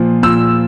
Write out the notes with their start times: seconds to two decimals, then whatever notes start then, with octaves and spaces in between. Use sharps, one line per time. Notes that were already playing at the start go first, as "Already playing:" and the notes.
Already playing: A#2 F3
0.23 A#2 E6